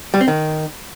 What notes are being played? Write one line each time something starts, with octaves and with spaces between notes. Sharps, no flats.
G3
C4
D#3